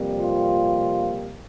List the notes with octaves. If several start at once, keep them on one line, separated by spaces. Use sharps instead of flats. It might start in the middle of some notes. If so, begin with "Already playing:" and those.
Already playing: F2 C3 G3 A#3
F4